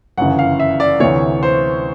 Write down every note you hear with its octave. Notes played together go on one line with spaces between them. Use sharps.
G1 F#2 C#3 E3 F#5
F5
E5
D5
D2 C3 E3 C#5
C5